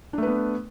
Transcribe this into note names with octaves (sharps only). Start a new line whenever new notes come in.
A3 B3 D4 B4